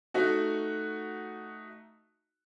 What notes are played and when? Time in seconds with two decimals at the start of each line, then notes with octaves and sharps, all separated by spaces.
0.14 A3 D#4 F#4